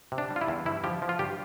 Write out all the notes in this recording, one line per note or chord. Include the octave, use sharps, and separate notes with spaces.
C3
D4
G3
F4
E4
E2
G2 E4
F3 G4
F3
F4
G2 G4